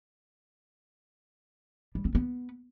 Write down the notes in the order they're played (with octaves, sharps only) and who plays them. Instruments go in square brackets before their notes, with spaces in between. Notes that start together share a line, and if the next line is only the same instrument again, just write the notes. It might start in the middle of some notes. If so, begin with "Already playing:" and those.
[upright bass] G3
C4
B3